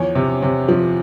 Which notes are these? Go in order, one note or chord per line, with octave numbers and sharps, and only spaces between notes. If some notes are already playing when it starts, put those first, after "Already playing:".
Already playing: E2 F3 C#5
C3
C3
F3